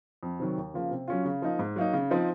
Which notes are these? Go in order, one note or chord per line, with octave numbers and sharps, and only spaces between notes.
F2
C3 D#3 F#3
D#2
C#3 F3 A#3
C3
F#3 C#4 F4
C#3
F3 A#3 D#4
G#2
F#3 A#3 D#4
C#3
F3 C4 D#4